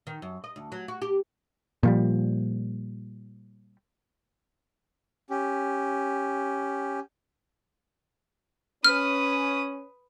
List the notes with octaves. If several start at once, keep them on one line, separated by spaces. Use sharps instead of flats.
D#3
F#2
D#5
D2
F#3
F#4
G4
A#2 F3 G3
C#4 G4
C#4 B4 D#6 F6